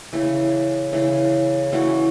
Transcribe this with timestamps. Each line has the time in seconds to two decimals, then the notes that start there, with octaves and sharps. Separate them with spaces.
0.13 C#3 E3 A3
0.92 C#3 E3 A3
1.72 E3 A3 C#4 F#4